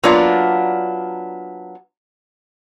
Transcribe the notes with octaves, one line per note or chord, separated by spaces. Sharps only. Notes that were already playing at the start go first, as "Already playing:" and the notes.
F#3 A#3 B3 D4 F4